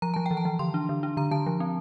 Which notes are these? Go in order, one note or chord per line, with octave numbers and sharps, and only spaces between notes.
F3 A#5
F3 A5
G5
E3
A5
E3
D3 C6
D4
D3
D4
D3 A#5
D3 A5
F3
C4